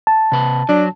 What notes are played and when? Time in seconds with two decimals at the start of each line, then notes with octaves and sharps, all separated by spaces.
0.07 A5
0.32 C3 B4
0.69 F#3 D4